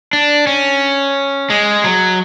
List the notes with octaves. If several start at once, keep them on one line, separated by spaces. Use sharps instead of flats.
D4
C#4
G#3
F#3